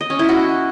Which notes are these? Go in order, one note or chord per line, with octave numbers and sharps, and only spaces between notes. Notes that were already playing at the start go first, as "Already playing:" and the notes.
D#5
C#4
E4
F#4